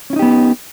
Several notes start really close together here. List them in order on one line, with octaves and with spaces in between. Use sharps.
C#4 E4 D#4 G4 B3